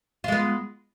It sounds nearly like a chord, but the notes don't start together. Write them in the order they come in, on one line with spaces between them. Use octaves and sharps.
F4 G#3 B3